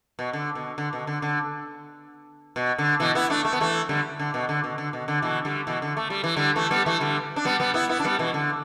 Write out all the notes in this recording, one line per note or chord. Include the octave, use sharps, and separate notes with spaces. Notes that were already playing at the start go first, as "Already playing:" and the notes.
B2
D3
B2
D3
B2
D3
D3
B2
D3
B2 E3
B3 E4
A3 D4
A3
B3
E3 A3
D3 G3
D3
B2
D3
B2
D3
B2
D3
B2 E3
D3 G3
B2 E3
D3
A3
G3
E3
D3 G3
E3 A3
G3 B3
E3 A3
D3 G3
D4
G3 B3
G3 B3
B3 E4
B3 E4
D4
G3 B3
B2 E3
D3